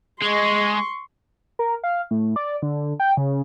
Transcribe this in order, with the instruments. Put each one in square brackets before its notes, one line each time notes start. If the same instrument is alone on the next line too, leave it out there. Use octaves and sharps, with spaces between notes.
[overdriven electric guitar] G#3 [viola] C6 C#6
[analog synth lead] A#4
F5
A2
D5
D3
G5
C#3